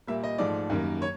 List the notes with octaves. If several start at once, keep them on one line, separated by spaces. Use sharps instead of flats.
A#2 G3 A#3 E5
D#5
G#2 F3 A3 D5
F#2 D#3 G3 A#3
C#5